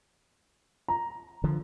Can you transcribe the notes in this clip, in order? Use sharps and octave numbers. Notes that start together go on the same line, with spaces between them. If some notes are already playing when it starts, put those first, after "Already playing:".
A#5
D3 F3